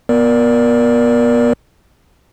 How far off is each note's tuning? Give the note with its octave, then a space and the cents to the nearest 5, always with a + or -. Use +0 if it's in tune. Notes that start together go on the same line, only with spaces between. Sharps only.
B3 -25 A#4 +15 D5 +0